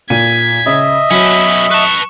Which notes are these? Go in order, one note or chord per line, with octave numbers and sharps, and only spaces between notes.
A#2 G#6 B6 D#7
C#3 D#5 E5
B2 F#3 C#4 B5
B4 A5 C#6